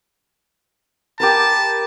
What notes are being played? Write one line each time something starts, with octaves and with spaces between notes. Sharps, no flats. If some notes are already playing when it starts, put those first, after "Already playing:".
G4 A#4 B4 A5